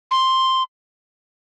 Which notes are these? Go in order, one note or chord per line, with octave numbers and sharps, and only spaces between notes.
C6